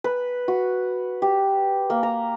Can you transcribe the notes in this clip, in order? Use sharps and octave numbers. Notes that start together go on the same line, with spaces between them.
B4
F#4
G4
A#3
A#5